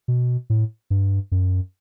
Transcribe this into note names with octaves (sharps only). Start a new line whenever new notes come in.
B2
A2
G2
F#2